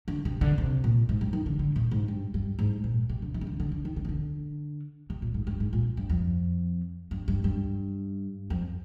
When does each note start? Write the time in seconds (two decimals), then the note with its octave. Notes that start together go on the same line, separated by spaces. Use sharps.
0.08 D3
0.25 C3
0.41 D3
0.58 C3
0.84 A#2
1.09 G#2
1.21 G2
1.33 D#3
1.46 D3
1.59 D3
1.76 A#2
1.91 G#2
2.08 G2
2.34 G2
2.59 G#2
2.84 A#2
3.09 C3
3.22 D3
3.34 D#3
3.41 C3
3.47 D3
3.60 D3
3.72 D3
3.85 D#3
3.96 D3
4.05 C3
4.09 D3
5.10 C3
5.22 A#2
5.34 G#2
5.47 G2
5.60 G#2
5.73 A#2
5.97 G2
6.10 F2
7.11 G2
7.28 G2
7.44 G2
8.50 F2